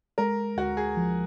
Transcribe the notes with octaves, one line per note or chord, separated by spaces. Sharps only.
G#3 A#4
D2 F#4
G#4
F3